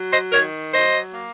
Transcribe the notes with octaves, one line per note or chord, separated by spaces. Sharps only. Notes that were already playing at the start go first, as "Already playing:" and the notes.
Already playing: F#3
C5 D#5
D#3 A#4 C#5
F#3 C5 D#5
A#3